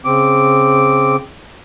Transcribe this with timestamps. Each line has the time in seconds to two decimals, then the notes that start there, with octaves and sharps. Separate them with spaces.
0.05 C#3 C4 D6